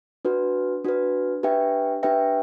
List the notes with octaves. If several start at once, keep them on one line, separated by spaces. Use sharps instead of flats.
D4 F#4 B4
D4 F#4 B4
D4 G4 B4 E5 G5
D4 G4 B4 E5 G5